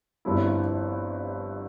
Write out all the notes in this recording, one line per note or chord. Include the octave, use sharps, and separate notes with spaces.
G1 G2 F3 C4 E4